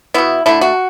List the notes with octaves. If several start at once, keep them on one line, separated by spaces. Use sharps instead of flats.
B2 B3 E4
D3 A3 E4
F#4